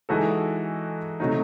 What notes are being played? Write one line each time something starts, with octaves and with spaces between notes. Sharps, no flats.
E3 G#3 D#4 F#4 A4
C3 F#3 A3 D#4